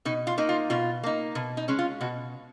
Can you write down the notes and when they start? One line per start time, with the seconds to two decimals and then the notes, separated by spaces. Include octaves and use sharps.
0.05 B2 D#4
0.27 F4
0.38 A#3 D#4
0.49 F4
0.70 B2 F4
1.04 A#3 D#4
1.35 B2
1.57 D#4
1.68 G#3 C#4
1.79 F4
2.01 B2 F#4